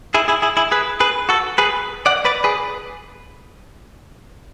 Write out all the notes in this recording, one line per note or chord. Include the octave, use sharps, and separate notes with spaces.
E4 G#4
E4 G#4
E4 G#4
E4 G#4
G#4 B4
G#4 B4
F#4 A4
G#4 B4
D5 F#5
B4 D5
G#4 B4